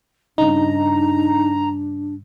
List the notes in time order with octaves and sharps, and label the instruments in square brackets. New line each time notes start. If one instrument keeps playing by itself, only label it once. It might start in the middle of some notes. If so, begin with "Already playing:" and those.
[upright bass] G2 C#3 [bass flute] D4 [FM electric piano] D#4 [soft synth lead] A#5